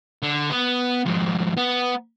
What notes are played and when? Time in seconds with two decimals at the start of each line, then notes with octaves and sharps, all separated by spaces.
0.23 D3
0.51 B3
1.06 F2 G#2
1.57 B3